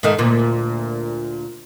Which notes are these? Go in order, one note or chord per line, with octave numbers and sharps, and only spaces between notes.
G#2 D#3 A3
D2 A#2